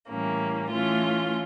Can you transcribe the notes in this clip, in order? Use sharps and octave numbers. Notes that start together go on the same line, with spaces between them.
A2 E3 G3 A#3 C#4
E3 A3 C#4 F4